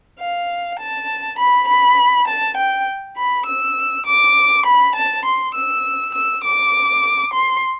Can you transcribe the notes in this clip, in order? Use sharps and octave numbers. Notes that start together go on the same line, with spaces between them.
F5
A5
B5
B5
A5
G5
B5
E6
D6
B5
A5
C6
E6
E6
D6
C6